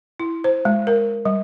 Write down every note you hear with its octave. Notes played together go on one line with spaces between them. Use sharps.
E4
C5
G#3
A#4
G3